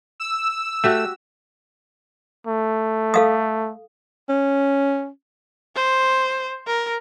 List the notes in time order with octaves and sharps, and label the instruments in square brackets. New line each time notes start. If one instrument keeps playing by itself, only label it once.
[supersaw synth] E6
[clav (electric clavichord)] A3 [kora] F#4 G4 E5
[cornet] A3
[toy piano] A4 F5 D#6
[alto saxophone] C#4
[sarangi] C5
A#4